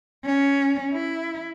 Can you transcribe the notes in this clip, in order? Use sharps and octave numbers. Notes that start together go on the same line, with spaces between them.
C#4
E4